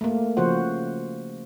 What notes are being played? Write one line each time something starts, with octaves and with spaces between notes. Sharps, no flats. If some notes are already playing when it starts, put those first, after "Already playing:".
A3 A#3
C#3 F3 F#4 C5 F#5